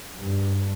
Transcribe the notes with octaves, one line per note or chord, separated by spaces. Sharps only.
G2